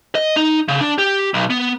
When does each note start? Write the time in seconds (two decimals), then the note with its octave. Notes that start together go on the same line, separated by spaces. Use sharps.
0.15 D#5
0.37 D#4
0.68 C#3
0.81 D4
0.99 G4
1.34 B1
1.50 B3